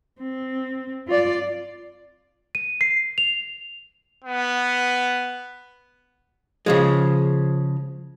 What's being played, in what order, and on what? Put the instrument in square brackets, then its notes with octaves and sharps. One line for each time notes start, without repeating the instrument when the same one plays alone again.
[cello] C4
F4 D5
[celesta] D#7
C7
F7
[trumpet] B3
[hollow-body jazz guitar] C#3 F3 G#3